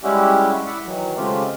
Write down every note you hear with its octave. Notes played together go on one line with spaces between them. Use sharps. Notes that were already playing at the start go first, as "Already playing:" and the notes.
G3 G#3 C#4 E4 F#4 G4
E4 D5 E5 F#5
D#3 E3 F#3
C#3 G#3 A3 C4 F4 G4